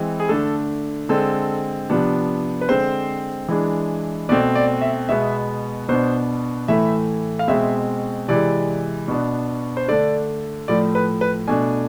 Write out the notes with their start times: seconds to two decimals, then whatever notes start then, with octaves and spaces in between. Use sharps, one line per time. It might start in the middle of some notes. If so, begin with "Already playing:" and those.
Already playing: E3 G#3 C4
0.20 G#4
0.29 D3 A3 D4 A4
1.09 D3 G#3 C4 A4
1.90 C3 F3 B3 D4
2.61 B4
2.69 D3 G#3 C4 C5
3.49 E3 G#3 D4
4.29 B2 A3 C4 D5
4.55 D5
4.82 E5
5.09 B2 G#3 B3 E5
5.89 B2 B3 D4 C5
6.68 A2 E3 A3 E5
7.39 F5
7.48 B2 G#3 C4 E5
8.28 C3 E3 G#3 D5
9.08 B2 B3 D4
9.77 C5
9.88 D3 A3 D4 D5
10.68 A2 F3 A3 D5
10.95 B4
11.21 B4
11.48 B2 A3 D4 G#5